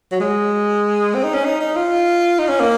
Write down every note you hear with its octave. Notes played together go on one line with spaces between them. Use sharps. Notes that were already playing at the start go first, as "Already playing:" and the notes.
F#3
G#3
C4
D#4
C#4
D#4
D#4
F4
D#4
C#4
A#3